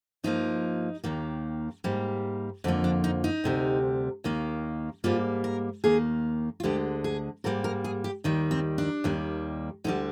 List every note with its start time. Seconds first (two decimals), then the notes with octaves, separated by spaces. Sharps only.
0.24 G2 F3 A#3 D#4
1.04 D#2 D#3 A#3
1.84 G#2 G3 A#3
2.64 F2 D3 F3 A#3 D4
2.84 D4
3.04 D#4
3.24 D#4
3.44 D2 C3 G3
4.24 D#2 D#3 A#3
5.04 G#2 G3 A#3 F4
5.44 A#4
5.84 D#2 D#3 A#3 G#4
6.60 F4
6.63 D2 D3 G#3 G4
7.04 G#4
7.44 G#2 G3 A#3 A#4
7.64 A#4
7.84 G#4
8.04 G4
8.24 D#2 D#3 G3
8.51 C4
8.78 D4
9.04 D#2 D#3 G3 A#3
9.84 D2 D3 G3 D#4